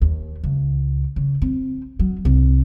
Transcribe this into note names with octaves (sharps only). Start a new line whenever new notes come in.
D#2
C#2
C#3
C4
F#3
C2